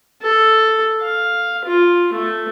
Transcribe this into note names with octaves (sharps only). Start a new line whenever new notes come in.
A4
F5
F4
A3